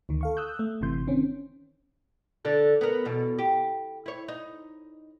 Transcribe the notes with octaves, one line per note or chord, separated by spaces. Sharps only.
D2 D#3
A4 F5 C#6
D#6 E6 F#6 G6
A3
G1 C3 E3 C6 G6
D#3 C4 C#4
D3 D4 A4
B3 A#4
E2 B2 A4
G4
E4 C#5
D#4